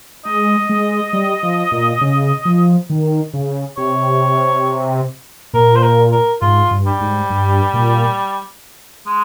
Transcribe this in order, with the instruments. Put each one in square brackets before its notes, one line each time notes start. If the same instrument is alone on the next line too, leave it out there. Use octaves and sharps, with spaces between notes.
[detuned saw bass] G#3 [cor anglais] D#5
[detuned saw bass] G#3
G3
F3
A#2
C#3
F3
D#3
C#3
[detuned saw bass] C3 [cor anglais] C#5
[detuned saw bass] A#2 [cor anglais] A#4
[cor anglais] C5
A#4
A#4
[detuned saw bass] G#2 [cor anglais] F4
[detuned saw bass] G2
[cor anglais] G3
[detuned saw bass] G#2
G2
A#2
[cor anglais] G#3